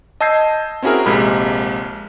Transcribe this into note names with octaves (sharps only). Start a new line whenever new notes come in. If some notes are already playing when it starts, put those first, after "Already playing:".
D#5 A5 E6 G6 G#6 C7
C4 C#4 E4 F#4 G#4 A#4
A#1 C3 G#3 A#3 A#4 B5